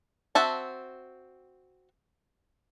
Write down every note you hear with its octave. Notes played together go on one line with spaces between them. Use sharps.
C4 F#4 E5 A5